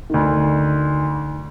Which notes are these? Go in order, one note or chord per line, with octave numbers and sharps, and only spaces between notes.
D2 D#3